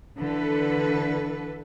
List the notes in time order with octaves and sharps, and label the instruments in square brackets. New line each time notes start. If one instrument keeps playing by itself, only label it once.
[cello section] D3 E3 A4 B4